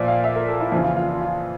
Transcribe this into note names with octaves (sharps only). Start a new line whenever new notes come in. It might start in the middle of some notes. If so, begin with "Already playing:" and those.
Already playing: A#2 F3 D5 E5
F5
E5
A#4
A4
E4
F2 C#3 E3 F4
F4
F4
F4
F4